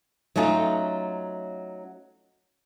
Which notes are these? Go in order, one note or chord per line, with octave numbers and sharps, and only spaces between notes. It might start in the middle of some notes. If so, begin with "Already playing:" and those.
F#3 A3 C#4 D#4 F4